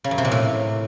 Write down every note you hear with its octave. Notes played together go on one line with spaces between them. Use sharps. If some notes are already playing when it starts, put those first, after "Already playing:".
C#3
F#2
C3
A#2
A2